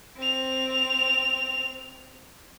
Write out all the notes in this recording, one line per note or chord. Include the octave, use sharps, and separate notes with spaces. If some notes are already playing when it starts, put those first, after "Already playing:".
C4 F7